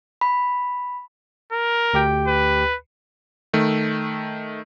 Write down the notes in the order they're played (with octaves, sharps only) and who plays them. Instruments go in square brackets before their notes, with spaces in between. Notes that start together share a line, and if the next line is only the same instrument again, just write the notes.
[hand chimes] B5
[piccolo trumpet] A#4
[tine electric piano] D2 G4 G5
[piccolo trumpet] B4
[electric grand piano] D#3 A3